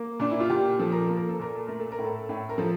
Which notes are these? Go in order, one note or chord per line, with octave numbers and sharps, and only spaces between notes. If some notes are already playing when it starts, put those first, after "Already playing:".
Already playing: A#3
A#2 D4
E4
F4
A#2 G4
F3 A4
A#4
A#3 A4
A#4
A4
A#2 A#4
A4
A3 A#4
A4
A#4
A2
A4
A2
A#4
F3 A4